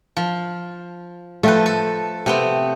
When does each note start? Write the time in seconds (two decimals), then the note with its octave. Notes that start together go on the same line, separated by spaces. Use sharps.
0.17 F3
1.43 F3 A3 A4 B4 G5
1.66 A4
2.26 C3 A3 B3 C4